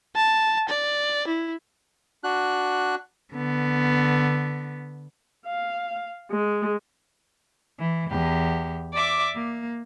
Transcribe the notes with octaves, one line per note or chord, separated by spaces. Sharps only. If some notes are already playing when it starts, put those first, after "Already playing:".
A5
D5
E4
D4 F#4 F#6
D3 B3
F5
G#3
E3
E2 G4
D5 E5 D6
A#3